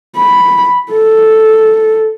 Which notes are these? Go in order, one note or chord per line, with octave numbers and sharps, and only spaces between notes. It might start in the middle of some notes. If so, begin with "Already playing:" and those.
B5
A4